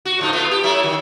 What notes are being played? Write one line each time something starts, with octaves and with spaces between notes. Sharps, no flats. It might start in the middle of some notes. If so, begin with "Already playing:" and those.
F#4
A2 F3 D#4
A3 B3 F4
G4
F#3 A3 E4
D#3